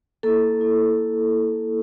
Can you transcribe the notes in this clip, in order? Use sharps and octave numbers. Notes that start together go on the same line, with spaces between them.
A#3 E4 A4
A#3 E4